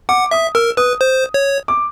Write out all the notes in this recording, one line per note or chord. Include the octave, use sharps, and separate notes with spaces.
F#5 D6
E5 D#6
A#4 E6
B4 D#6
C5
C#5
D6